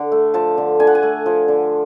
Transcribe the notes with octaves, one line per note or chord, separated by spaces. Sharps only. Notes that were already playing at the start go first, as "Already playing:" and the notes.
Already playing: D3
A3
F3 A5
D3
D3 G#5
F#5
G#5
A3
F3
D3